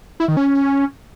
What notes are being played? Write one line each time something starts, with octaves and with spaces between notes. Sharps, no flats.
E4
D#3
C#4